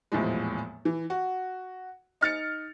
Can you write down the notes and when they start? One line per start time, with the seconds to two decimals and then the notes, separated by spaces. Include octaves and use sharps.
0.12 D#1 E2 A2 F3 G#3
0.85 E3
1.10 F#4
2.21 D#4 F6 A6 C#7